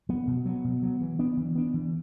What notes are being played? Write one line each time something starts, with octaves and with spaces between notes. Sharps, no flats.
F#3 B3
B2
F#3 B3
B2
F#3 B3
E3
B3 D4
E3
B3 D4
E3